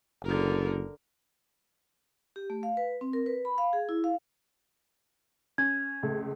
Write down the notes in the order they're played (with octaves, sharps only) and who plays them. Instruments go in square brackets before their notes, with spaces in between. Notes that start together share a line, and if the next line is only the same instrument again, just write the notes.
[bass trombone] F#1 [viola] D3 A#4
[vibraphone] G4
A3
F5
B4
C4
A#4
B4
B5
F5
G#4
E4
F5
[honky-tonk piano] C#4 [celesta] G#6
[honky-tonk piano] F1 C#2 A3